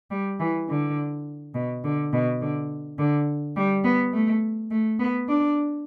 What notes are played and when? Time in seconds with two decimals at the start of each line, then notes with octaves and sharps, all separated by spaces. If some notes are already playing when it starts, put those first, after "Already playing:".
0.11 G3
0.40 E3
0.69 D3
1.54 B2
1.84 D3
2.13 B2
2.41 D3
2.99 D3
3.56 G3
3.84 B3
4.13 A3
4.71 A3
4.99 B3
5.29 D4